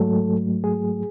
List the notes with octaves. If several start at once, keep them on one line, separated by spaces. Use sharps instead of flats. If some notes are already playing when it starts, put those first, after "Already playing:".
Already playing: G#2 F#3 A3 A4
G#4